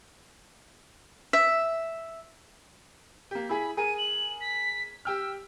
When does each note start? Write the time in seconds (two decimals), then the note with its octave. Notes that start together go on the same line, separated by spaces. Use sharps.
1.33 E5
3.31 A#3 G4
3.49 E4 G#4 B5
3.77 G#4 A#4 D#7
3.98 F#7
4.41 B6
5.05 G4 G5 E6 F6